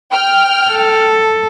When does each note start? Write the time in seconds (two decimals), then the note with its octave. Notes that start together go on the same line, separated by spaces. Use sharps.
0.12 G5 F6
0.71 A4